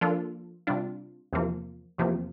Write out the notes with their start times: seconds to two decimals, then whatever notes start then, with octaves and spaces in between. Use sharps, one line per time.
0.01 F3 A#3 D4 F4 A4
0.67 C3 G3 D4 F4
1.33 E2 C3 F3 A#3
1.98 E2 C3 F3 A#3